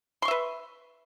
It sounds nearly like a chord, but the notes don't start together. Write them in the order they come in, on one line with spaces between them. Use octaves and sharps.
C6 C#6 E5 B4